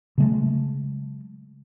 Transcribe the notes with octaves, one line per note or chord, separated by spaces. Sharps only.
C#3 F#3 G#3 A3